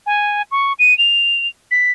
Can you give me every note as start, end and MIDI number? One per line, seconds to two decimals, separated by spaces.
0.06 0.42 80
0.51 0.73 85
0.79 0.96 99
0.98 1.48 101
1.71 1.92 95